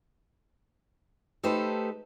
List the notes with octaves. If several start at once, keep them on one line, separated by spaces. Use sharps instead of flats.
A3 D#4 G4 A4 B4 C5